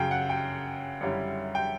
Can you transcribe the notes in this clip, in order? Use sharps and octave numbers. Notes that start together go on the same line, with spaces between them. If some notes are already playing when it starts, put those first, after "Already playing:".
Already playing: F#2 C#3 F#3 G5
F#5
G5
F#2 D3 G3 C#4 E4
G5